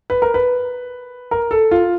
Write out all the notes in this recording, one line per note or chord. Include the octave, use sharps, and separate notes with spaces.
B4
A#4
B4
A#4
A4
F4